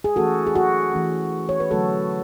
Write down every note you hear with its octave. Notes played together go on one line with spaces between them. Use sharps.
G#4
E3 A3 C#4 F#4 A4
G#4
F#4
E3 A3 C#4
C#5
B4
D3 F#3 A3 C#4 F#4 A4